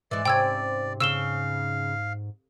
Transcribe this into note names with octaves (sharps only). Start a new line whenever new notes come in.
G#2 E3 G#3 D5
C3 C#4 G5 E6 G#6
C#3 F5 E6 E7 G7